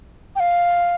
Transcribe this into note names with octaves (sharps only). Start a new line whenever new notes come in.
G5
F5